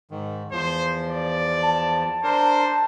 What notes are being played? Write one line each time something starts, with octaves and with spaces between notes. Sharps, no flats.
G#2 D#3
E2 F3 C5
D5
A5
D4 A#4 C5